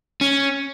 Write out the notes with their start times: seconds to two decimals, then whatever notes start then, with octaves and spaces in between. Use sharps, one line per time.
0.21 C#4